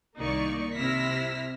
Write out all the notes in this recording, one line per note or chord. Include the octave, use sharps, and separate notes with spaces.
C2 D#3 A#3 D#4 D5 C#6
C3 E4 E6 F6 A#6 B6